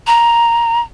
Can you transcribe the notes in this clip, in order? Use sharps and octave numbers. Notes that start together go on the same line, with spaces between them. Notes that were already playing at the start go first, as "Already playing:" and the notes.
A#5